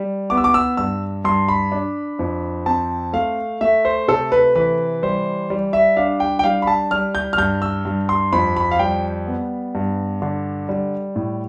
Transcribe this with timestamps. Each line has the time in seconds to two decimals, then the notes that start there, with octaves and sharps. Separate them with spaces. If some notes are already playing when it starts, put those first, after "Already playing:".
Already playing: G3
0.30 B3 D6
0.37 E6
0.44 D6
0.54 E6
0.77 G2 E6
1.25 G2 C6
1.48 B5
1.72 D4
2.19 F2
2.66 C4 A5
3.13 A3 F5
3.61 A3 E5
3.85 C5
4.08 C3 A4
4.32 B4
4.55 E3 B4
5.03 G3 C5
5.50 G3
5.73 E5
5.97 D4 F5
6.20 G5
6.39 G5
6.44 G3 F5
6.62 B5
6.67 A5
6.91 G3 F6
7.15 G6
7.33 F6
7.38 G2 G6
7.62 E6
7.85 G2
8.09 C6
8.32 F2 B5
8.57 B5
8.71 F5
8.79 G3 G5
9.27 B3
9.75 G2
10.22 D3
10.69 G3
11.16 A2